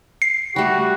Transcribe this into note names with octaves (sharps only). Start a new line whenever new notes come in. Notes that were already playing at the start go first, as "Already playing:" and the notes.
C7
G3 A3 F#4 G4